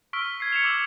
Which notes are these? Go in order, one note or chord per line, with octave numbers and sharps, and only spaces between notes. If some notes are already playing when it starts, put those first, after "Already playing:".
C#6 E6 F6 B6 D7 G7
G#6 C7
C#7 E7 F7
D6 E6 G#6 E7 F#7